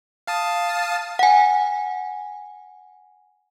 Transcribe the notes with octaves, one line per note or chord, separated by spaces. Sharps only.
F5 A5 D#6
F#5 G#5